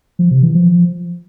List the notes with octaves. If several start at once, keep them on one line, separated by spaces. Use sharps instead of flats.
F3
C3
E3
F3